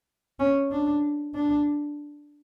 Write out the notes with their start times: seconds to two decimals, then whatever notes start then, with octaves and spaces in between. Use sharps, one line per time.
0.39 C#4
0.71 D4
1.35 D4